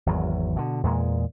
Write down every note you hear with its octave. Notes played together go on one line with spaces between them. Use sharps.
G#1 E2 F#3
B2 D3
E2 A#2 G#3